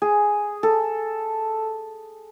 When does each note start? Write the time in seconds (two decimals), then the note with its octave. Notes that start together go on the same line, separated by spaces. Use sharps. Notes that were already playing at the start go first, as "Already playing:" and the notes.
0.02 G#4
0.63 A4